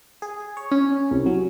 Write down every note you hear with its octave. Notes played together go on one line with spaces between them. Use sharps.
G#4
C#5
C#4
C2
F#3